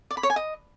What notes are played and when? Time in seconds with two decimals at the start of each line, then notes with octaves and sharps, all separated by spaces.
0.11 D5
0.17 B5
0.23 C#5
0.30 G#5
0.36 D#5